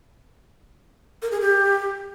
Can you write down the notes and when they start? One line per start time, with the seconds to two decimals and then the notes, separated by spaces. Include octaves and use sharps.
1.22 A#4
1.32 G#4
1.41 G4